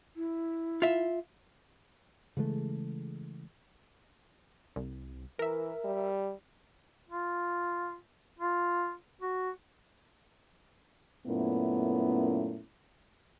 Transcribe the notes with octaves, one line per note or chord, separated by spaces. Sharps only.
E4
F4 E5
C#3 E3 G#3 A3
C2
E3 A#4 E5
G3
F4
F4
F#4
F#2 A#2 A3 B3 C#4 E4